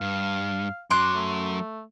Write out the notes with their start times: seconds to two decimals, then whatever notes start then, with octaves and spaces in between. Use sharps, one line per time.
0.01 G2 F5
0.90 F#2 F#3 C6 D6 F#6
1.15 A3